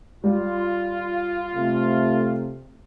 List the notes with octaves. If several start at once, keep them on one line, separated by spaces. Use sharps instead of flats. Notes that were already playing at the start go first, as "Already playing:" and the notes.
G3 F4
C3 A3